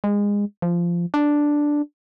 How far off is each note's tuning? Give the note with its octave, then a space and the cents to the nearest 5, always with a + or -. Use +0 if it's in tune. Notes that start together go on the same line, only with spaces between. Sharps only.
G#3 -25
F3 -15
D4 +0